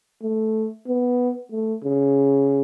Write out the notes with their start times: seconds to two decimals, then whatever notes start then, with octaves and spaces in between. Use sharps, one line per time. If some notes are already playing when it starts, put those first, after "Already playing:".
0.22 A3
0.87 B3
1.52 A3
1.84 C#3